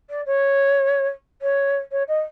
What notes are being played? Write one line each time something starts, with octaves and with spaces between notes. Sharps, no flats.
D5
C#5
C#5
C#5
D#5